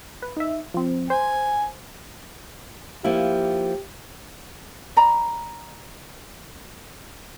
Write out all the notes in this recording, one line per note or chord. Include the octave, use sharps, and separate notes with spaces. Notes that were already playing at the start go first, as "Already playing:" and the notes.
B4
D#4 E5
F3 C4
C5 G#5
F3 A#3 E4 G4
D5 A#5 B5